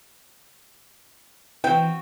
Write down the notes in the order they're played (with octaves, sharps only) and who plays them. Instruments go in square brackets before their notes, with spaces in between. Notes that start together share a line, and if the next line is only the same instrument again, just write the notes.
[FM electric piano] E3 [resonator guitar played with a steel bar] C4 F#4 [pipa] G5